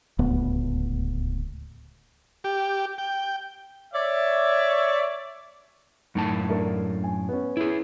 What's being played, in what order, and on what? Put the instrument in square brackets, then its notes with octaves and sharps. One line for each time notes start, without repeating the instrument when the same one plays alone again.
[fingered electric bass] D1 C#2 A2 B3
[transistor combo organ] G4
G5
[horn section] C#5 D5 E5
[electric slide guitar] F#2 A2 A5 [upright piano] D#3
[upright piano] A3 D4 A#4
G#5
B3 C#4
[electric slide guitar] E4 G#4